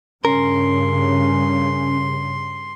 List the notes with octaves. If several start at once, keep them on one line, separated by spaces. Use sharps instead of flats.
G2 C#3 C#4 A#4 C6